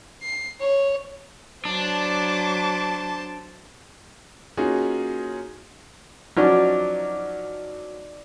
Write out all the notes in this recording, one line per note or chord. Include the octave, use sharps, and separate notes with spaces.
C7
C#5
F#3 D4 C5 A5 D6
A#3 C#4 D#4 F4 F#4 G#4
F3 F#3 C#4 D#4 D5